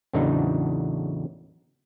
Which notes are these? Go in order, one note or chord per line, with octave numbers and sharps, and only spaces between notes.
E2 A2 C#3 F#3 D4 D#4